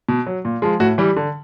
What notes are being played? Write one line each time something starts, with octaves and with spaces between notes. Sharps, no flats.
B2
F#3
A#2
F3 G#3
A2 F#4
E3 G3
D3